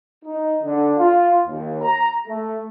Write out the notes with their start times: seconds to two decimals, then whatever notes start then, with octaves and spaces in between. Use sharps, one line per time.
0.25 D#4
0.63 D3
0.98 F4
1.47 D#2
1.82 A#5
2.27 A3